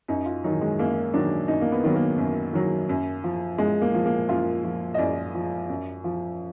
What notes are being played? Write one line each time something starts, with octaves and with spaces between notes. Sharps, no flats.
F#2 D#4
F4
D#3 F#3 D#4
G#3
F#2 A#3
D#3 F#3 D4
F#2 D#4
A#3
B3
D#3 F#3 B3
A#3
F#2
D#3 F#3
F#2
F3
F#2 G#3
A#3
F3
A#3
F#2 F4
F3
D#5
F#2 D5
F3
F#2
F3